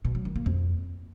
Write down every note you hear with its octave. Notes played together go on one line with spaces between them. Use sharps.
B2
F#3
D#3
A#3
F2